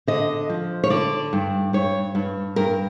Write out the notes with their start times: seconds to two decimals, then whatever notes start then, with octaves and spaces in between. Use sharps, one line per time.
0.07 D3 D#5
0.49 F3
0.84 C#5
0.90 D3 D5
1.33 G2
1.73 G2 C#5
2.15 G2
2.56 G2 A#4